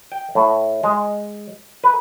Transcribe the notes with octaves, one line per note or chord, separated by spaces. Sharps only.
G5
A2
G#3
B4